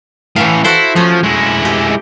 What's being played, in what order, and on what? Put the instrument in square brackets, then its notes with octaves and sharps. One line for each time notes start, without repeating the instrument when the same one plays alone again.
[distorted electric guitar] A2 C#4 [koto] E3 E5 F5
[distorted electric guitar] E4 [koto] F#4 A4 C5
[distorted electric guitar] F3 [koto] A3 C#4
[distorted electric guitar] G#3 E4
[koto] G4